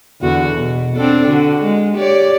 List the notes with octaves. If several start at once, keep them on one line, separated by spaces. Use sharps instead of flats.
E2 D3 F#4
B2
C4 D4 A4
D3 F#4
G#3
G4 C#5 D5